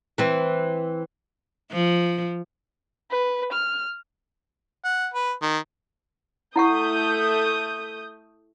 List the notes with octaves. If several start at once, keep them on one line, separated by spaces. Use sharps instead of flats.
E3 C4
F3
B4
F6
F#5
B4
D#3
A3 E4 F#5 C#6 D#6 G6